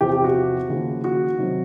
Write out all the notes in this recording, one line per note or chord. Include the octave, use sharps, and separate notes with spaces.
E2 C3 F3 G4
G4
F#4
D#2 C#3 F3
F#4
C3 D#3 F#3